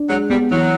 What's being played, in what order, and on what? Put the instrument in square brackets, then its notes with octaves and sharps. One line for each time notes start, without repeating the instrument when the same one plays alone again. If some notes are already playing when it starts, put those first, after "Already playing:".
Already playing: [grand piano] D4
[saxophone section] F#3 [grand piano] G#3
[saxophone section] G3 [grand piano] B3
[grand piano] E3 [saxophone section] F#3